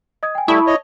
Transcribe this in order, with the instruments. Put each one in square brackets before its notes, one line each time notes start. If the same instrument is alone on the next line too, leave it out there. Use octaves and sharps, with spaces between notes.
[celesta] D#5 D#6 G#6
G5 G#5
[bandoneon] G3 A3 [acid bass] E4 [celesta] A5 C#6 D#6
[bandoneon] C#5 D#5